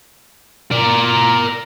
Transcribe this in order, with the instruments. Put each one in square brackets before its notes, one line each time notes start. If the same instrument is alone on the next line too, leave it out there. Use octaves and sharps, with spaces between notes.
[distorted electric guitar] A#4 D5